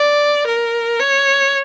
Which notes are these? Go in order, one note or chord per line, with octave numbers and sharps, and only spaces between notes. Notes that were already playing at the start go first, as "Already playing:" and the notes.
Already playing: D5
A#4
C#5